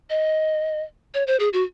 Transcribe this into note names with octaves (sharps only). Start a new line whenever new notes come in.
D#5
C#5
C5
G#4
F#4